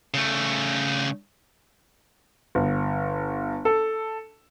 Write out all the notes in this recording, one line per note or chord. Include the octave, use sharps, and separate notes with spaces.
C#3 A3
G1
A4